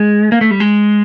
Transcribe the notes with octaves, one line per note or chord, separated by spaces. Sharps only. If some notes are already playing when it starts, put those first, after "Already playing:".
Already playing: G#3
A#3
A3
G3
G#3